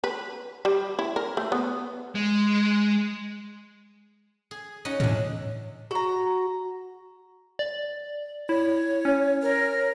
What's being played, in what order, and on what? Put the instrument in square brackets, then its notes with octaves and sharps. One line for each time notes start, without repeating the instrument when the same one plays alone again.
[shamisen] B4
G3
E4
A#4
A3
B3
[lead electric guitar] G#3
[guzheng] G#4
C#4 D#4 F#4
[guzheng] E2 D4 [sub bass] A2
[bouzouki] F#4 A#5
[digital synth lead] D5
[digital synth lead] E4 [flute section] C#5
[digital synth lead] C#4
[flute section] A#4 C#5 F6